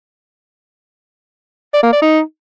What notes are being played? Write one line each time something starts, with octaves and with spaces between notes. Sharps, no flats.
D5
A#3
D5
D#4